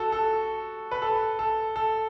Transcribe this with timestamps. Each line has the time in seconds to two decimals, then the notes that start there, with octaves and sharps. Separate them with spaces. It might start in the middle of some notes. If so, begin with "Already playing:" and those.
Already playing: F#4 A4
0.12 A4
0.91 B4
1.02 A4
1.39 A4
1.76 A4